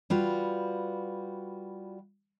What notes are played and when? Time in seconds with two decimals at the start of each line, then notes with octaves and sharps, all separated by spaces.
0.10 G3 F4 F#4 B4